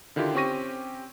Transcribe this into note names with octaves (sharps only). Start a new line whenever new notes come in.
D3 D#3 E4 F4 G4
C4 C#4 G4 C#6 A#6 D#7